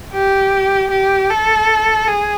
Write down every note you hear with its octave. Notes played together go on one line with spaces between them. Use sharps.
G4
G4
A4
G#4